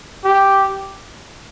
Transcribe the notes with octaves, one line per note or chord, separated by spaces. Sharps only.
G4